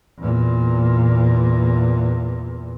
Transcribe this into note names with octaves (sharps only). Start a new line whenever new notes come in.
E2 A#2